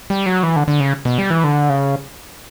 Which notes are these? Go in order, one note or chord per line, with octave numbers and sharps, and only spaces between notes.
G3
F#3
E3
D3
D3
C#3
B2
G3
E3
D3
C#3